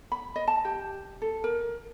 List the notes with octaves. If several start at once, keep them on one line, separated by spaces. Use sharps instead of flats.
B5
D#5
A5
G4
A4
A#4